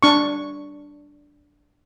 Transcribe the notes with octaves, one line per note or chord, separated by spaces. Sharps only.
D4 C#6